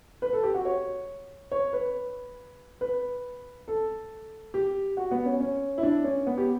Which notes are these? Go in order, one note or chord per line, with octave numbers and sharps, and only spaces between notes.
B4
A4
G4
F#4
C#5
C#5
B4
B4
A4
G4
F#4
B3
C#4
C#4
E4
D4
C#4
B3
G4